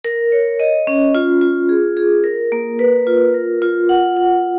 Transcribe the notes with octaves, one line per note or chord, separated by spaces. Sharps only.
A#4
C#5
D#5
C#4
F4
F4
G#4
G#4
A#4
A#3
B4
F4
A#4
F4
F#5
F#5